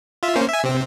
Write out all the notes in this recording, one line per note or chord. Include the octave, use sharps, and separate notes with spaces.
F4 E5
A#3 C#4 C5
E5 G#5
C3 C4